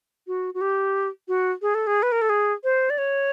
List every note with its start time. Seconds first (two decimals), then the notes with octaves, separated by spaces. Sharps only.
0.27 F#4
0.54 F#4
0.61 G4
1.28 F#4
1.62 G#4
1.75 A4
1.87 G#4
2.03 B4
2.12 A#4
2.22 A4
2.30 G#4
2.64 C5
2.90 D5
2.98 C#5